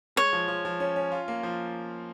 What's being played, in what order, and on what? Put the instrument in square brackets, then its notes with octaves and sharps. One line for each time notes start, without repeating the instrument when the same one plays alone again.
[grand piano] G#3 [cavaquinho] C#5
[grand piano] F3
F3
F3
C#4
C#4
F4
A#3
F3